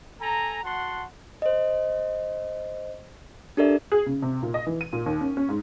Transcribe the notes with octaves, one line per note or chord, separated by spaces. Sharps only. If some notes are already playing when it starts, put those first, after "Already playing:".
A4 G#5 A#5
F#4 F#5 A5 C6
C5 D#5
D4 G4 A4 A#4 D5 E5
G#4
C#3
C3
A#2
D#5
E3
D#7
A#2
D#2
C#4
C#4
G#2